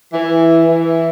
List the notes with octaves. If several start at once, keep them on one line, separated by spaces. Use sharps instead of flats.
E3
E3